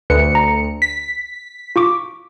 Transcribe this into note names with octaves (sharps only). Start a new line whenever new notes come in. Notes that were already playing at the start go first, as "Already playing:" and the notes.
D2 B4 C#7
A#5
B6
F4 C#6 D6